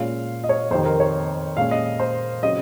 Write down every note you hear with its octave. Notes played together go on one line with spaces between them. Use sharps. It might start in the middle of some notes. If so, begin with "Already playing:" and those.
Already playing: A#2 G#3 C#4 F4 F5
D#5
C#5
F2 C3 D#3 C5
A#4
C#5
A#2 G#3 C#4 F5
D#5
C5
C#3 F#3 C4 D#5